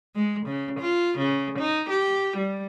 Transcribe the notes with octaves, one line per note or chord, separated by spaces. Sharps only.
G#3
C#3
F4
C#3
D#4
G4
G3